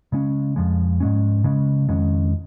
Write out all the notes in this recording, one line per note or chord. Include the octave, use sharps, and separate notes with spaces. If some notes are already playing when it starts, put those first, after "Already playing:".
C#3 G#3 C#4
F2 F3 G#3
G#2 G#3 C#4
C#3 G#3 C#4
F2 D#3 G#3 C#4